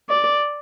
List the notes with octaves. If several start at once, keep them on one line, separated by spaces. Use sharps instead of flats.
D5